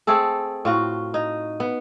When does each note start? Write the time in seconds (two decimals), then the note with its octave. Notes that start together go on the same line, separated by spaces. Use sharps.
0.07 A3 C4 G#4 A4
0.65 A2 F4 F#4
1.14 D#4
1.60 B3